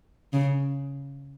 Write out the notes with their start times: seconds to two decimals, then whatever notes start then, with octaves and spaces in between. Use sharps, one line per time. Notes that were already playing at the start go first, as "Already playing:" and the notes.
0.33 C#3